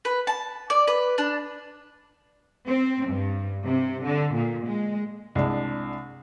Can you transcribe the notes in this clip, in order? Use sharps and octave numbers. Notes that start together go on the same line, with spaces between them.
B4
A5
D5
B4
D4
C4
G2
C3
D3
A#2
G#3
C2 G#3 D4